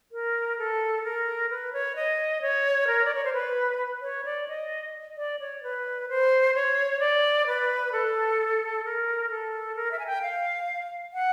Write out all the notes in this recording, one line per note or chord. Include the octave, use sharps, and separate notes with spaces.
A#4
A4
A#4
B4
C#5
D#5
C#5
A#4
D5
C#5
C5
B4
C#5
D5
D#5
D5
C#5
B4
C5
C#5
D5
B4
A4
A#4
A4
A#4
E5
G#5
G5
F5
F#5